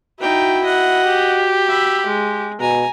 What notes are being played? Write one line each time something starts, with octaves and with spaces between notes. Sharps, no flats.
D#4 E4 F#4 G5
D#5 F#5
G4
E5 B5
G#3
B2 G#5 A#5